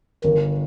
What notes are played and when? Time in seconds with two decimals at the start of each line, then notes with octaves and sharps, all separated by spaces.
0.24 G1 D#3